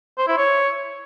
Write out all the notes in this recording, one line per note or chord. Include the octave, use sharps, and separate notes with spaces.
C5
E4
C#5